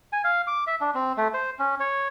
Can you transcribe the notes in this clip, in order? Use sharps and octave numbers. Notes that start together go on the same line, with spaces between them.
G#5
F5
D6
E5
D4
C4
A3
C5
C#4
C#5